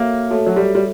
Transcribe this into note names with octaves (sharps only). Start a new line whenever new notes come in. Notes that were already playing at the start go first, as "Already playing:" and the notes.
Already playing: A#3 F#4 A4 C#5 E5
A3 F#4 A4 C#5 E5
F#3
G3
G3